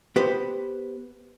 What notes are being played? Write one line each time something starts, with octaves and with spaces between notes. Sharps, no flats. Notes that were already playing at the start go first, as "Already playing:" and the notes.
B3 G4 B4 C5